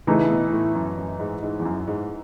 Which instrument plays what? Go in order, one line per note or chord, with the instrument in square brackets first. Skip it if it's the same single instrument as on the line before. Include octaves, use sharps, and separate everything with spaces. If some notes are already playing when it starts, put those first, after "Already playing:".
[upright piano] C#3 [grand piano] E3 A3 D#4
[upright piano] B2
A2
F#2
F#2
G#2
G#2
E2
F#2
G#2